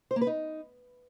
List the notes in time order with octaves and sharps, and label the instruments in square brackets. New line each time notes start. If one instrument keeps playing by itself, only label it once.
[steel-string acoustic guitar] C5
A#3
B4
D#4